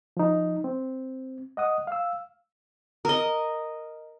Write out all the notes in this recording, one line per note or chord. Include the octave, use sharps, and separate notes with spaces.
F3 D#4
C4
D#5 F#5 D#6
F5 E6
A#4 D#5